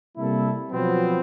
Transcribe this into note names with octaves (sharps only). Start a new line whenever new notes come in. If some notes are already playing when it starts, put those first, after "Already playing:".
C3 G3 A#3 E4 A4
B2 F3 F#3 B3 C4